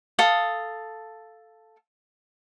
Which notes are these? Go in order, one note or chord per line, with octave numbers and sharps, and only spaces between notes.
A4 F5 D#6